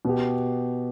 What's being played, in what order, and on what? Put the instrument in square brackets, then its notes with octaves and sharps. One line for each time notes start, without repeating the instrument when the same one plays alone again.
[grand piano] B2 B3 G4